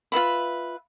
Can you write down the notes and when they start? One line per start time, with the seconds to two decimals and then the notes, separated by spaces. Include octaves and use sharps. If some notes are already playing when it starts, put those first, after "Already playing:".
0.12 F4 B4 E5 B5